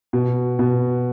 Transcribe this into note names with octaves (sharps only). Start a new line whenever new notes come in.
B2
B2